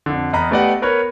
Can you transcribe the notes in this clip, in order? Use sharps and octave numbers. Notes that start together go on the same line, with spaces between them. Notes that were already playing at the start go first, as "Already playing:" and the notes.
F2 D3
E2 D#5 A#5 B5
A3 B3 G4 D5 D#5 F#5
B3 A#4 B4 C#5